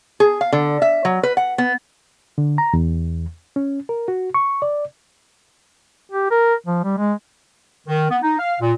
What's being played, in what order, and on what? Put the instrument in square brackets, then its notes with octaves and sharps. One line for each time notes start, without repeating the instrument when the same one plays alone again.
[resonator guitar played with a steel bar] G#4
F5
D3
E5
F#3
B4
F#5
B3
[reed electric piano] D3
A#5
E2
C#4
A#4
F#4
C#6
D5
[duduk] G4
A#4
F3
G3
G#3
[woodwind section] D#3
B3
D#4
F5
A#2